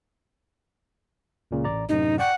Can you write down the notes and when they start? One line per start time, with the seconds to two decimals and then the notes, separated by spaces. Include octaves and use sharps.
1.51 C#2 A#2 C#3
1.64 A1 D5 A#5
1.89 F#2 A2 C3 D#4
2.19 D5 F#5 G5 C#6